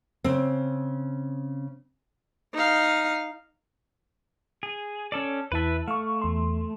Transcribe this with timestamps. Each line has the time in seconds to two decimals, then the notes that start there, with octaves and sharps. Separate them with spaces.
0.24 C#3 C4
2.54 D#4 F5
4.63 G#4
5.12 C#4 A4 D5
5.52 E2 E4 B4 E5 A5
5.88 A3 F5 C#6
6.22 E2 C6